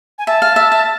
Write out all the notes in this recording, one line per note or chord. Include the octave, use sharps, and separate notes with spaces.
G#5
E5 A5
F5
E5
E5